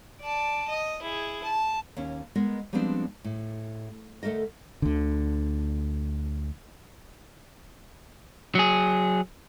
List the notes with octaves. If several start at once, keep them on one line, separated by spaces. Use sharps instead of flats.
D5 A5
D#5
E4 G#4
A5
D#2 C#4
G#3 B3 A#4 D#5
F3 G3 G#3 B3 C4 D4
A2
D2 A3 A4 A#4 D#5
D2 D3
F#3 G#4